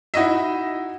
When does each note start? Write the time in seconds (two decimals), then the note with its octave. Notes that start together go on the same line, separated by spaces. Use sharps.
0.14 D#4 E4 F#4 D#5 E5